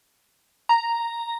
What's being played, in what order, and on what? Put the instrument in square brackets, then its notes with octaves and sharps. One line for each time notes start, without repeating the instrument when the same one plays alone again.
[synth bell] A#5